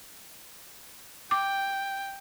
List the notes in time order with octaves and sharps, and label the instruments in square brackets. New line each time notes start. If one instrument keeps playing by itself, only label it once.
[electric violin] G5 [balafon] D6